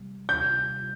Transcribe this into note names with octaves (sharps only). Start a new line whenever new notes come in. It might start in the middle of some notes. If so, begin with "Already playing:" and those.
Already playing: C3 G3
G6